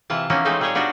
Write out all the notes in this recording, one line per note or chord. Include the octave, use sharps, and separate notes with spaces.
C3 E3 F4 A5
E3 F3 A#3 B3 C#4 D#4
G#3 A3 C4 D#4 A4 C5
A#2 G3 G#4 C5 C#5 G5
B3 D4 D#4 F4 F#4